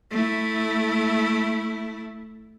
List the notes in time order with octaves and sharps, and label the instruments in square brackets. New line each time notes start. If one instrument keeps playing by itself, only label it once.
[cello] A3 E4